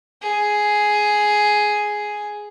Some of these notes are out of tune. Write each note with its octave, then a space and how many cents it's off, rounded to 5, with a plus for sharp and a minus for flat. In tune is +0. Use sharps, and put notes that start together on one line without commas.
G#4 +5